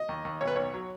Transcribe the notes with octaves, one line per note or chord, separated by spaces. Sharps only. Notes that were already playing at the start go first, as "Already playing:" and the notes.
Already playing: D#5
D#2
D#2
B1 C#5
B4
B1 C#5
F#3